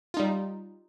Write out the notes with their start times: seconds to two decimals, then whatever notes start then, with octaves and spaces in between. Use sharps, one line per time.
0.14 F4
0.17 D#4
0.20 G3